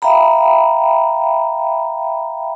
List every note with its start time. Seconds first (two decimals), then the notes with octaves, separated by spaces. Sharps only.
0.02 E5 F5 G5 A#5 B5